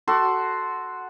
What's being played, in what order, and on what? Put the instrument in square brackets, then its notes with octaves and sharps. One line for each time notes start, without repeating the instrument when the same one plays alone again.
[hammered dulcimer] F#4 A4 C6